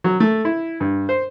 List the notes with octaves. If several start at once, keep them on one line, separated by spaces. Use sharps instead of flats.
F#3
A3
E4
G2
C5